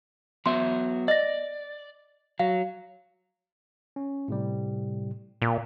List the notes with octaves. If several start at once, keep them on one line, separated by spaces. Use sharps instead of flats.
F#3 B3 E5 C6
D5 D#5 A#6
F#3 F5
C#4
A2 C3 G3
A#2